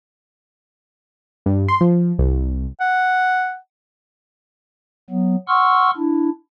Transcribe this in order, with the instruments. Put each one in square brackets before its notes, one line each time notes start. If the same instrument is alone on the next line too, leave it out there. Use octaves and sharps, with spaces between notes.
[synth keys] G2
C6
F3
C2
[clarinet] F#5
[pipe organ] F#3 B3
F#5 C6 C#6 E6 F6
D4 E4